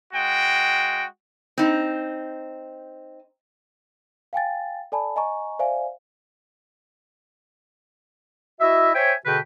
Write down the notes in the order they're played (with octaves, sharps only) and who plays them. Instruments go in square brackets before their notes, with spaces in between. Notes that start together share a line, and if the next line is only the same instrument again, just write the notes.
[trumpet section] G#3 F#4 G5
[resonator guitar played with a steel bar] C4 D#4
[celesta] F5 G5 G#5 A6
A4 D5 G#5 A5 B5
D#5 G#5 A#5 C#6
C5 D5 E5 F5 G#5
[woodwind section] E4 F#4 D#5 E5
C5 C#5 E5 G5 G#5
B2 D3 F#4 G#4 B4 G5